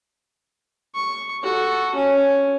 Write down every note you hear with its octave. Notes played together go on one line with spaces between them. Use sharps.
C#6
F#4 A4
C#4